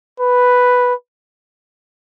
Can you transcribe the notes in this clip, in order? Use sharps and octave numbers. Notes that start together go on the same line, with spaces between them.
B4